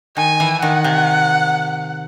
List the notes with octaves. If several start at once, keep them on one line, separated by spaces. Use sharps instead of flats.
D#3 G#5
E3
D#3 F#5
C3